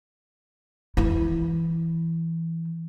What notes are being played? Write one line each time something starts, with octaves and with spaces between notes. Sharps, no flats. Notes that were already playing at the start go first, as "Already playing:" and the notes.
E3 E4